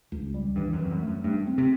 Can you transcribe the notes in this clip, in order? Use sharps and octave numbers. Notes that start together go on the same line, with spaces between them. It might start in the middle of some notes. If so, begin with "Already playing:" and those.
C#2
G3
G2 E3
F#2
F2 E3
F#2
A3
F#2
G2 A3
C4
C3